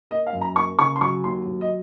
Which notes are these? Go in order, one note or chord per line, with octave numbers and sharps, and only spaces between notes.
A#3 D#5
F5
F#2
A#5
A#3 C#6
C#3 C#6
C6
F#3 C#6
D#2 C6
F#3
D#5